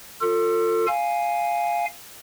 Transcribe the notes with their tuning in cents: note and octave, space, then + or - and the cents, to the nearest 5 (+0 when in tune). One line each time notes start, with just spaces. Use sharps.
F4 +20 A4 +30
F5 +0 G#5 +0